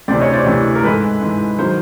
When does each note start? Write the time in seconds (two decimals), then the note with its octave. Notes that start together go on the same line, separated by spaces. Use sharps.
0.08 D2 C3 E3 C5 D5
0.20 C#5 D#5
0.33 C5 D5
0.46 D2 C3 E3
0.75 A#4
0.83 G#2 E3 A4 B4
1.21 G#2 E3
1.58 D#3 F#3 A#4 C5